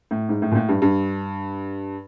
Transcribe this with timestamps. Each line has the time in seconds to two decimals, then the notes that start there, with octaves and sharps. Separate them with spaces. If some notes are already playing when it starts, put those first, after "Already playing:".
0.11 A2
0.29 G#2
0.42 A2
0.52 A#2
0.55 A2
0.69 G2
0.82 G2